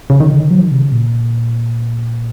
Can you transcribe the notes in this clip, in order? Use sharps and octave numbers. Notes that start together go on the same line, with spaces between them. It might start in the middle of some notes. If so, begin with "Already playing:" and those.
C#3
D#3
C#3
D#3
F#3
D#3
C3
C#3
A#2